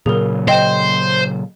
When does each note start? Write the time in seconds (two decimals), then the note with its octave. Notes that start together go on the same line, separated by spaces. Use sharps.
0.06 A#2 C#3 F#3 G#4 A#4
0.48 C5 D#5 G5